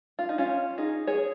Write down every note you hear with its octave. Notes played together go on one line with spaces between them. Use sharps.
F4
D#4
C#4 F4
D#4 G#4
G#4 C#5